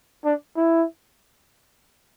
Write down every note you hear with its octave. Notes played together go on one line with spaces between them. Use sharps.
D4
E4